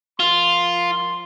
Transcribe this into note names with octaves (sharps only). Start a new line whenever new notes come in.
F3 F4 A#4 C6